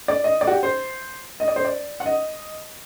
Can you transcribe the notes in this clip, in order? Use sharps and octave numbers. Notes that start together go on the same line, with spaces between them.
D5
D#5
D5
F#4
G4
C5
D#5
D5
C5
D5
F#5
D#5